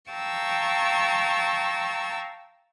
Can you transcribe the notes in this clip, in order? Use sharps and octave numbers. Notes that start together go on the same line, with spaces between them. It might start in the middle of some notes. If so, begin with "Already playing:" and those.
F5 G5 A5 A#5 C#6 E6